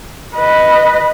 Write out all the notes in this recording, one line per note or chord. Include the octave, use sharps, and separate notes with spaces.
B4 D#5